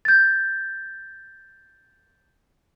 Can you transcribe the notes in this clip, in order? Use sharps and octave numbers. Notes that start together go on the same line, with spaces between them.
G6 A6